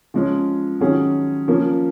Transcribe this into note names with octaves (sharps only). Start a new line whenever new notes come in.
F3 G#3 C#4
D#3 F#3 C#4 G#4
F3 A#3 C#4